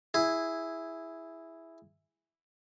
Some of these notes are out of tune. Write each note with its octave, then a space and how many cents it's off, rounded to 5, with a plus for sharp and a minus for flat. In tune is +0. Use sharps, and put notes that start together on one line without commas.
E4 +0 G#4 -5